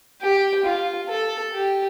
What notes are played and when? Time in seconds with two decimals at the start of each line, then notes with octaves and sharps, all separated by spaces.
0.22 G4
0.65 F4
1.09 A4
1.54 G4